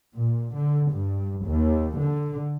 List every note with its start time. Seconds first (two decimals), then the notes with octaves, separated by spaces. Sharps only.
0.15 A#2
0.55 D3
0.92 G2
1.45 D#2
1.98 D3